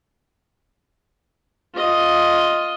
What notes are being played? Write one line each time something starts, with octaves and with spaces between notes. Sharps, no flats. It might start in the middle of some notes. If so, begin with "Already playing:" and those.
F4 D#5